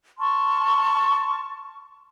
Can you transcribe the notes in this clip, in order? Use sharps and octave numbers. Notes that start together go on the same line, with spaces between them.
A5 C6 C#6 F6